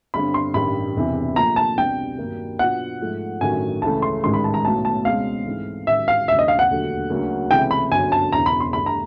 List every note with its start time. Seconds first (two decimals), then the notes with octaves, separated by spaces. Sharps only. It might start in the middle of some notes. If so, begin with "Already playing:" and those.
0.14 G1 G2 D3 G3 C4 B5
0.34 C6
0.54 A1 G2 D#3 G3 B5
0.96 E1 E2 C3 E3
1.36 A#2 F3 A3 A#5
1.56 A5
1.77 C2 B2 G3 B3 D4 G5
2.18 G2 D#3 F#3 A#3 D4
2.59 B2 F#3 B3 D4 F4 F#5
3.01 G#2 F3 A3
3.41 A1 G2 D#3 F#3 A3 G#5
3.82 C#2 C#3 E3 A3 A5
4.02 C6
4.23 A1 G#2 D#3 G#3 C6
4.34 B5
4.44 A5
4.54 A#5
4.64 B1 A2 F#3 B3 A5
4.85 A5
5.05 C#2 B2 G#3 C4 F5
5.46 G#2 E3 A3 C4
5.87 A1 G#2 D#3 F#3 E5
6.08 F5
6.28 E1 D2 C#3 E5
6.39 D#5
6.48 F5
6.59 F#5
6.69 E1 D#2 D3 F#3 A3
7.10 D2 C#3 F#3 A#3 C#4
7.51 C#2 C3 E3 A3 G5
7.71 B5
7.91 G1 F#2 D3 F#3 G#5
8.12 A5
8.32 E1 E2 C#3 E3 A#5
8.46 B5
8.60 C6
8.73 G2 E3 A3 D4 B5
8.86 A#5